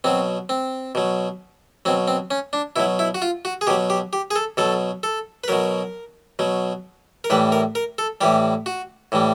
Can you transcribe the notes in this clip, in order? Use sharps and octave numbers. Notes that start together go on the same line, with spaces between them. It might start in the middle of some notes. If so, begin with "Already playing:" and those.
B2 F#3 C4
C4
B2 F#3
B2 F#3 C4
C4
C#4
D4
B2 F#3 E4
E4
F#4
F4
F#4
G#4
B2 F#3 G4
G4
G4
G#4
A4
B2 F#3 A4
A4
B4
B2 F#3 A#4
B2 F#3
A#4
A2 E3 G3 B4
A#4
A#4
A4
A2 E3 G3 G4
F#4
A2 E3 G3